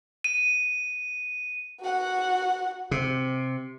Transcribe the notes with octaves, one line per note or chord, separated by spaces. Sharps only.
D#7
F#4 F#5
C3